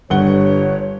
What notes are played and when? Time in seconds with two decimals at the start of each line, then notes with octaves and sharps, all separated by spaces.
0.10 G1 G2 C#5 F#5 G7